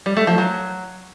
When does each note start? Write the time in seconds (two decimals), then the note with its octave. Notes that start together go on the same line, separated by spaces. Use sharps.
0.06 G3
0.17 A3
0.27 F3
0.38 F#3